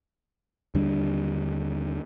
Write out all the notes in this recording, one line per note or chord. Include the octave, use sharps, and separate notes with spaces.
D#2 D3 G3 D4